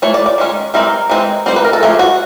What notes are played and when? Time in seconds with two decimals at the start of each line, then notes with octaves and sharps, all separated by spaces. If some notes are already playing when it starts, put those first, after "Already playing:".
0.02 E3 A3 C#5
0.14 D5
0.26 D5
0.38 D#3 G#3 C#4
0.74 E3 G3 C4 D#4 A#4
1.10 E3 G#3 C4 D#4
1.46 G3 C4 D#4 C5
1.56 B4
1.65 A#4
1.73 A4
1.83 F3 A3 D4 G#4
1.99 F#4